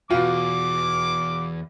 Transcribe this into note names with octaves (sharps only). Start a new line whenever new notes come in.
E2 B2 F4 D6